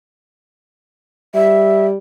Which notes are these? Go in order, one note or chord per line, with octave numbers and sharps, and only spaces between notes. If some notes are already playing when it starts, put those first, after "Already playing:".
G3 E5